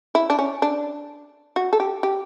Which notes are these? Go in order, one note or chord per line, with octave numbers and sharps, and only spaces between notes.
E4
D4
C#4
D4
F#4
A4
G4
G4